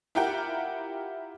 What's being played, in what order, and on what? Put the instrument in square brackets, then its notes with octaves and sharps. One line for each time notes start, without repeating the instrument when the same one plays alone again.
[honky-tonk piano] E4 F4 G4 A#4 F#5 G5